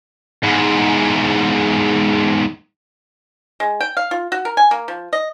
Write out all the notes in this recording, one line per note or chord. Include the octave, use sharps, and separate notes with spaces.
E2 G#2
G#3
G5
F5
F4
F#4
A#4
G#5
A#3
F3
D#5